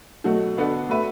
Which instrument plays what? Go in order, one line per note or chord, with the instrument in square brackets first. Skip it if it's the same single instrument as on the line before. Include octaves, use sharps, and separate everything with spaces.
[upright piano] B2 F#3 A3 F#4
D3 B3 D4 F#4 A4
A3 F#4 B4 E5